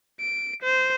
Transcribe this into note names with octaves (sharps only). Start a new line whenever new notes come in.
D7
C5